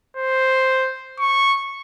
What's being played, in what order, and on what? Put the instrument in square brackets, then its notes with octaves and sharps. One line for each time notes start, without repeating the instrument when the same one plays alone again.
[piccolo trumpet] C5
C#6